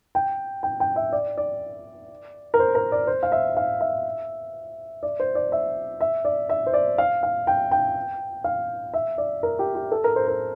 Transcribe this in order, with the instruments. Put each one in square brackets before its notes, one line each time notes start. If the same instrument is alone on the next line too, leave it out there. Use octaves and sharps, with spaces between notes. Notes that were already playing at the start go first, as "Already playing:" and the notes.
[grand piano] G5
G5
G5
E5
D5
D5
A#4
C5
A#4
D5
C5
F5
E5
F5
E5
D5
C5
D5
E5
E5
D5
E5
C5
D5
F5
F5
G5
G5
F5
E5
D5
A#4
G4
G4
A4
A#4
C5
A#4